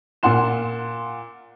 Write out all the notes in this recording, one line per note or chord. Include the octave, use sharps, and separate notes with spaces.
A#2 F4 F#5 C6 E7